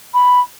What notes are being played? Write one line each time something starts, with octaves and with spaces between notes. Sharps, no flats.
B5